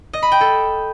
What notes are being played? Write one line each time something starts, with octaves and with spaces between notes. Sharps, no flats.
D#5
B5
G5
A4